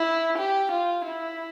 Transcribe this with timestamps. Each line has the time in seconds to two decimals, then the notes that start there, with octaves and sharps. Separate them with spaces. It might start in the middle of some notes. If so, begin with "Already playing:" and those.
Already playing: E4
0.37 G4
0.71 F4
1.04 E4